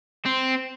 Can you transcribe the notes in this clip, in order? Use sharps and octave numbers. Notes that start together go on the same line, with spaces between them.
C4